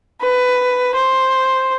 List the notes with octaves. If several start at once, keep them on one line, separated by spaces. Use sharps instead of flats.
B4
C5